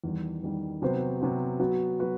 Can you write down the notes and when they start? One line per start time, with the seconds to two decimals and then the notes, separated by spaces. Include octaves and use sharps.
0.04 E2 D#3 G3
0.43 E2 D#3 G3
0.82 C3 F#3 B3 F#4 C5
1.20 C3 F#3 B3 F#4 C5
1.60 F#3 B3 F#4 B4
1.99 F#3 B3 F#4 B4